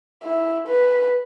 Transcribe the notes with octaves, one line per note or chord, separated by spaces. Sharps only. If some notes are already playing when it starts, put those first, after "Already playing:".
E4
B4